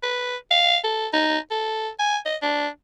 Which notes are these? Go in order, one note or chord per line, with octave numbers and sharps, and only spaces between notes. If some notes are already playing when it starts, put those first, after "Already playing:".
B4
F5
A4
D#4
A4
G#5
D#5
D4